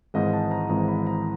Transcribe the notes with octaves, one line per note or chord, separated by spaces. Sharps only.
G#1 G#2 E3 G#3 D#5
A5
A#5
G#1 G#2 E3 G#3 A#5
B5
A#5